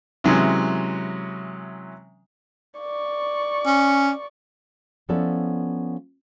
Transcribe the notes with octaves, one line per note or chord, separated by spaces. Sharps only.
C3 E3 F#3 G#3 C#4
D5 C#6
C#4
F3 B3 C#4 E4 A4 D5